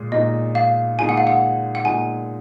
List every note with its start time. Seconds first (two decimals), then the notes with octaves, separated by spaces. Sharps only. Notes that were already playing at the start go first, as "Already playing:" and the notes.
Already playing: A#2 G#3
0.12 A#2 G#3 D#4 D#5
0.55 F5
0.99 A#2 G#3 D#4 G#5
1.09 F#5
1.17 F5
1.27 F#5
1.75 F#5
1.85 A#2 G#3 D#4 G#5